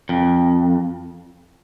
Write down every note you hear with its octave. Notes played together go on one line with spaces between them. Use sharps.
F2